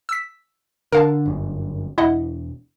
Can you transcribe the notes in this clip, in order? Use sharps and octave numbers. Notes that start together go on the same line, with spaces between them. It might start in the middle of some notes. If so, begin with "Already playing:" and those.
E6 B6
D3 A#4 F5 A5
G1 F#2
E1 E4 D#5 F#5